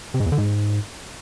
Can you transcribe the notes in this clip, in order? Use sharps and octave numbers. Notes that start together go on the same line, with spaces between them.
C3
G#2
E2
D3
G#2